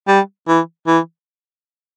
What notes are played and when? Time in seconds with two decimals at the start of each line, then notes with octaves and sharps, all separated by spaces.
0.08 G3
0.48 E3
0.87 E3